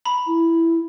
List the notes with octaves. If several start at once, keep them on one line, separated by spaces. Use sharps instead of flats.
A#5 B5
E4